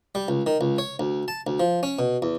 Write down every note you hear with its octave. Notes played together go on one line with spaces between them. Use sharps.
G3
C#2
D#3
C#2
C#5
D2
A5
D2
F3
C#4
B2
E2